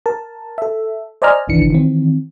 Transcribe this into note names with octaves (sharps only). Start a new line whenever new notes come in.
A#4 A5
A4 E5
C5 D5 D#5 G#5 A#5 F6
G1 C2 D#3 E3 D4 C#7
D#3 E3 C4